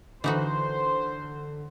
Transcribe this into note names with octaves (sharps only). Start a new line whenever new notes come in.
D3 E3 D#4 F#4 C5